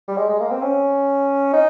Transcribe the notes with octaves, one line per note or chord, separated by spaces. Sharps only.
G3
G#3
G#3
A#3
C4
C#4
D#4